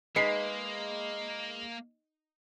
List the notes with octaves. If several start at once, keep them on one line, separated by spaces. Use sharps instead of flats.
G#3 A#3 D#4 G#4 B4 B6 C7